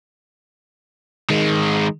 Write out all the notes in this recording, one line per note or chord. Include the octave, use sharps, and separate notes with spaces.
D#3 G#3